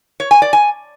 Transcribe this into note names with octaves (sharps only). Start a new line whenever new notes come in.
C#5
G#5
D5
G#5